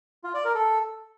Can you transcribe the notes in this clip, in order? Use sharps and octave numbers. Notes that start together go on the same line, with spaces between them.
F4
D5
A#4
A4